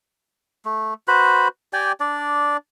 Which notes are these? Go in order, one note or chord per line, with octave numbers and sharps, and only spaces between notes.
A3
F#4 B4 C5 B5
G4 D5 G5 G#5
D4 D5